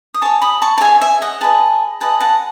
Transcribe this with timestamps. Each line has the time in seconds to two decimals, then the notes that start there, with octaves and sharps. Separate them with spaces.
0.14 D#6
0.21 G#4 C#5 A5 C#6
0.42 B5 D#6
0.62 A5 C#6
0.78 A5
0.81 G#4 C#5 E5 G#5
1.01 E5 G#5
1.22 D#5 F#5
1.41 G#4 B4 D#5 F#5 A5
2.00 G#4 B4 D#5 F#5 A5
2.20 F#5 A5